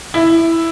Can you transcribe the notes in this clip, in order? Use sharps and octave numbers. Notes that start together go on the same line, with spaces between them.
E4